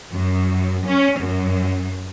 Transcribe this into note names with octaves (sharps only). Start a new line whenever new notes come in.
F#2
C#4
F#2